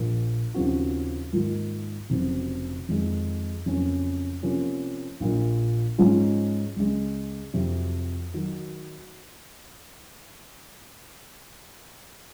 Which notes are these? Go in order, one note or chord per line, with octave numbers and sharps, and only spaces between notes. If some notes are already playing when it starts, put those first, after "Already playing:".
Already playing: A#1 A#2 F3
D#2 C#3 F3 C4 F#4
G#2 D#3 A#3 F4
F1 F2 C#3 F#3 C4
F2 D#3 G#3
F2 C#3 F#3 A#3 C#4
C3 F3 A#3 C#4
A#1 A#2 F3
G#2 F3 G#3 C#4 F4
C#2 C#3 G#3
F2 C3 F#3
D#3 F#3